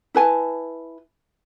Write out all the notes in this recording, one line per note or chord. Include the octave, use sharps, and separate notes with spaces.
E4 B4 G#5 A5